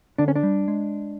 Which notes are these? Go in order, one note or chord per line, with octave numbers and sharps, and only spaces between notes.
D3 D4
C#4
D4
G3
G#3